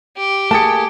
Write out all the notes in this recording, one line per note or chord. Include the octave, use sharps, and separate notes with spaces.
G4
A3 A#3 G#4 A5 A6 C#7